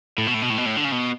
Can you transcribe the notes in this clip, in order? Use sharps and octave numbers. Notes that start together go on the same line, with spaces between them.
A2
B2
A2
B2
A2
B2
A2
D3
C#3
B2